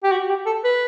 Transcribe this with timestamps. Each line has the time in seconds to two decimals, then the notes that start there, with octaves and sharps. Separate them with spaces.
0.03 G4
0.12 F#4
0.29 G4
0.46 A4
0.64 B4